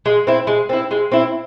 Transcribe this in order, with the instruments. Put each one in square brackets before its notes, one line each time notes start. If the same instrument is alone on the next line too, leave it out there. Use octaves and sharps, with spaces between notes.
[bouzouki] G#3
C4 E4
G#3
C4 E4
G#3
C4 E4